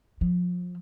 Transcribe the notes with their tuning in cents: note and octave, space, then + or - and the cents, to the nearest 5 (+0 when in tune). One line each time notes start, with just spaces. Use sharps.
F3 +30